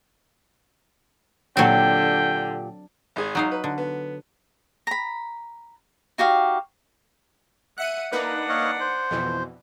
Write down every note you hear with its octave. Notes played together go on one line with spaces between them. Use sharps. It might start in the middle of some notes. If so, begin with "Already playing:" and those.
A#2 D3 F#3 C4 G4 G5
G#1 G#4
F#3 D#4 F5
B4
D3
B3
A#5 B5
D#4 F#4 G4 F5
E5 F#5 F#6 C#7 D#7
A#3 D4 D#4 B4 F#5
C#5 D#5 F5
C5
F2 B2 E3